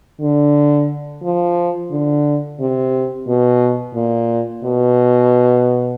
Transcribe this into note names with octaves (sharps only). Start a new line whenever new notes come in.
D3
F3
D3
C3
B2
A#2
B2